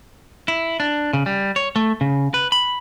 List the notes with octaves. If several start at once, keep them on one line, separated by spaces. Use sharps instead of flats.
E4
D4
C#3
G3
C#5
A3
C#3
B4
B5